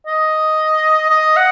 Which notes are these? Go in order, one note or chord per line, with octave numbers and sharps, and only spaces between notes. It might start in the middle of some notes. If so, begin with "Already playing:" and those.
D#5
D#5
F#5